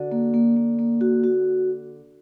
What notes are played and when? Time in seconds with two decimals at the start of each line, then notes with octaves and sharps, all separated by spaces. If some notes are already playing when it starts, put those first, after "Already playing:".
Already playing: D3 F#4
0.12 A#3
0.34 A#3
0.57 A#3
0.79 A#3
1.01 F#4
1.24 F#4